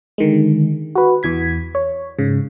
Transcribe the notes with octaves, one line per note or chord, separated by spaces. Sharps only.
D3 D#3 G#3
F#4 B4
E2 E3 G#6 B6
C#5
G#2 C#3